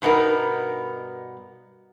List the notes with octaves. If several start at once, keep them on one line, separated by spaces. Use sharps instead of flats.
G2 B2 B3 D#4 A#4